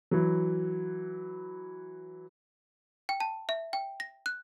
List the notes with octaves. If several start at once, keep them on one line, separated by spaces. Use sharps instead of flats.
E3 F#3
G5
A5
E5
G5
A#6
F#6